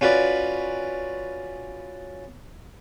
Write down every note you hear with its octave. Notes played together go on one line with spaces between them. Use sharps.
C#4 F4 F#4 B4 D5